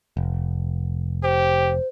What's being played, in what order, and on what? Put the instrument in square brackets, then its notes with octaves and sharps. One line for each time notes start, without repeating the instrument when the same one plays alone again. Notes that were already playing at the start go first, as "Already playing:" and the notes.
[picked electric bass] F1
[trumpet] G4 [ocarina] C5